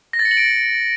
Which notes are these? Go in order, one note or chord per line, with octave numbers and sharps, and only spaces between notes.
A#6
A6
C#7
F#7
D7